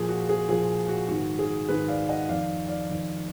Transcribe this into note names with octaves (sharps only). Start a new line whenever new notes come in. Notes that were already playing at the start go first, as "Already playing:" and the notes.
Already playing: A#2 F3 G#4
F#4
G#4
A#2 F3 G#4
F#4
G#2 D#3 F#4
G#4
G#2 D#3 G#4 B4
D5 F5
D#5 F#5
F2 D#3 D5 F5
D5 F5
F2 D#3